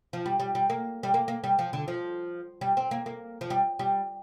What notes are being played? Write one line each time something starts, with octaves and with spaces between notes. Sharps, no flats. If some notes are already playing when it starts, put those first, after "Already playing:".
F3
G3
G3
G3
A#3
G3
A#3
A#3
G3
F3
D3
F3
G3
C4
A#3
A#3
F3
G3
G3